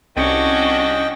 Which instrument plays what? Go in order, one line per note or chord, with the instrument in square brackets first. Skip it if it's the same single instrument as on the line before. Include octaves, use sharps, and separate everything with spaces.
[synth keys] C2 [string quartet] C#4 D4 F#4 [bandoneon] D#5 G5